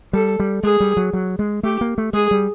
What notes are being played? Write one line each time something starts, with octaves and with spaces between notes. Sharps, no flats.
G3 A4
G3
G#3 G#4
G3
F#3
F#3
G#3
A3 G4
A#3
A3
G#3 G#4
G3